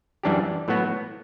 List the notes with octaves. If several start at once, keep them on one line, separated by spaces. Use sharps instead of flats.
F#2 E3 G3 D4 G4
A2 F#3 B3 F#4